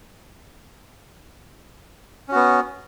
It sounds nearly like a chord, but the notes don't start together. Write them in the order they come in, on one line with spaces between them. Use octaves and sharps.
C#4 F#4 B3